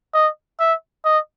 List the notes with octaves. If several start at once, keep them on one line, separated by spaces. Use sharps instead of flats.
D#5
E5
D#5